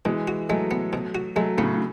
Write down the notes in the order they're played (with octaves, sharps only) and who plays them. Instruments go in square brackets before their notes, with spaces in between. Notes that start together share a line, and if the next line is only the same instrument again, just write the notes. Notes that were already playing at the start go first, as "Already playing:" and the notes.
[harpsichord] B2 [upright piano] E3 G#3
[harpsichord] F#4
[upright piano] F#3 A3 [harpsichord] G#3
[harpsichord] B3
B2
F#4
[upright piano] F#3 A3 [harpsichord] G#3
[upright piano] A2 C#3 [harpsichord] B3
[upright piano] A2